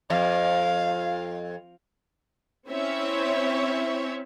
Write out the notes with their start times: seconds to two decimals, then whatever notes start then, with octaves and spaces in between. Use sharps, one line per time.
0.10 F2 F5
2.69 C4 C#4 E4 C#5 E5